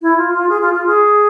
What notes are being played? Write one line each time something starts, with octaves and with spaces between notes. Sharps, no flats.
E4
F4
F4
G#4
F4
F4
G#4